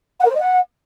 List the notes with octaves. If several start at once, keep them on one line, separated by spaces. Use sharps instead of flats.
F#5
A#4
C5
D#5
F#5